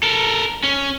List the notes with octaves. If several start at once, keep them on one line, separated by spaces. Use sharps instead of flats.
A4 A#4
C#4